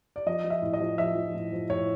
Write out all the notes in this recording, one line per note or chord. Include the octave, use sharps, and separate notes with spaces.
D5
F3 D#5
F3
E5
A2
D#5
F3
F3 E5
F3
A2
F3
A2 C#5